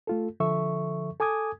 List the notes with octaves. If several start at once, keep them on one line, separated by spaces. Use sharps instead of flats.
A3 F4 A4
D3 F3 A4 E5 C#6
A4 G#5 D6 D#6 G#6